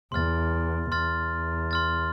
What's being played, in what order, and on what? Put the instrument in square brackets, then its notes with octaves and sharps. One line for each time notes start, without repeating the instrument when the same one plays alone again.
[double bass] E2 [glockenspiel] C6 F6 A6
[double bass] E2 [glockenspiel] C6 F6 A6
[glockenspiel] C6 F6 A6